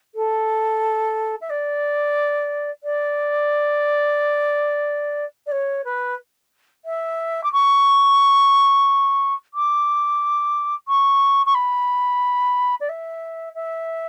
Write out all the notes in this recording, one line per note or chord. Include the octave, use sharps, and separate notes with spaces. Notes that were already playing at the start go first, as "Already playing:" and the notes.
A4
E5
D5
D5
D5
C#5
B4
E5
D6
C#6
D6
C#6
C#6
B5
D5
E5
E5